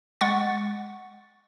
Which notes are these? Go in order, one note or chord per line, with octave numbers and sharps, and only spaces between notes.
G#3 F#5 C#6 A6